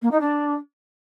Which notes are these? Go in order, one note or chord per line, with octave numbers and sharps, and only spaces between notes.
A#3
D#4
D4